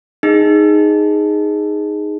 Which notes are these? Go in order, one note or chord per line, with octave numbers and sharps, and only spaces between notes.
D#4 G#4